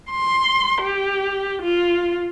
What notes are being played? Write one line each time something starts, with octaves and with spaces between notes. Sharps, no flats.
C6
G4
F4